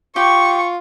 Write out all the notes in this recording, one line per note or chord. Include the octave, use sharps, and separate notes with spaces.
F4 G4 G5 C#6